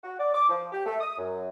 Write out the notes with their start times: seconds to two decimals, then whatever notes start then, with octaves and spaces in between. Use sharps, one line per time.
0.04 F#4
0.19 D5
0.34 D6
0.49 F3
0.72 G4
0.86 A3
1.00 D#6
1.17 F#2